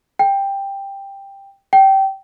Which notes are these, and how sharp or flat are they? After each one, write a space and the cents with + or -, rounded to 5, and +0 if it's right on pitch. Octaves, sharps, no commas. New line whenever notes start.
G5 +10
G5 -20